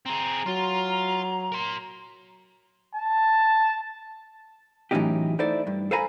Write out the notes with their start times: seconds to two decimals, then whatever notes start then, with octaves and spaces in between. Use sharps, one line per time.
0.06 C4 G#4 A#5
0.46 F#3 F4
1.52 A#4 C6
2.95 A5
4.91 A2 E3 F#3 C#4 D#4 G4
5.39 D#4 E4 A4 C5 D5
5.67 G2
5.91 A4 C5 F5 G#5 A#5 B5